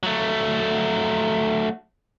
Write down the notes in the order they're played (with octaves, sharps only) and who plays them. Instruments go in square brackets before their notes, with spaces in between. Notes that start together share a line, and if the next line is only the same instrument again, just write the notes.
[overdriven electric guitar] F#3 A3